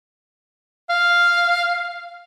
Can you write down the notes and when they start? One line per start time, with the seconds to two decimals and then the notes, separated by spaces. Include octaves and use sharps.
0.90 F5